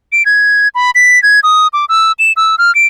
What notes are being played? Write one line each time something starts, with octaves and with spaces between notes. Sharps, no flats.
D7
G#6
B5
B6
G#6
D#6
D6
E6
E7
E6
F6
D7